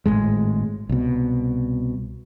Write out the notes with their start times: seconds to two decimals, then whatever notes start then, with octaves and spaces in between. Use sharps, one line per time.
0.06 G#1 F#2 A2 G#3
0.89 C2 B2